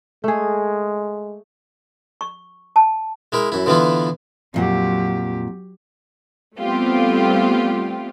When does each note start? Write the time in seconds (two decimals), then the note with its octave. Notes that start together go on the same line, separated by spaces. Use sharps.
0.24 G#3 A3 G#4
2.21 C#6
2.76 A5
3.32 G#3 E4 A#4
3.52 F#2 E4
3.66 D3 E3 B3 E4 F4
4.54 F2 A#2 F#3 G4 F#5
6.58 G3 A3 B3 C4 F4 G4